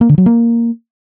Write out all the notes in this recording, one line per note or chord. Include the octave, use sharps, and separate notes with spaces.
A#3
D3
F#3
A#3